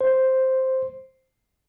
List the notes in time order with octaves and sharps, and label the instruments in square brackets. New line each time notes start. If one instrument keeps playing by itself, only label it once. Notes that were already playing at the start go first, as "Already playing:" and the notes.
[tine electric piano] C5